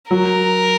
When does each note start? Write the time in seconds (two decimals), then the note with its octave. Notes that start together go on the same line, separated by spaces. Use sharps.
0.11 F#3 A#4